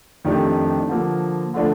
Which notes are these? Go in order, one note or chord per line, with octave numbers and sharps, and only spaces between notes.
F2 D#3 A3 D4 G4
D3 F3 A#3
D3 F3 A3 D4 F4